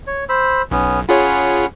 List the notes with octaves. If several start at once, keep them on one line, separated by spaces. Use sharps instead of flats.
C#5
C5 B5 E6
B1 B3 C#4
C#4 F4 G#4 C#5 F#5 B5